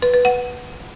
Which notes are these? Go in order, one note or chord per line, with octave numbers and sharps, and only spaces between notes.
B4
B4
F#5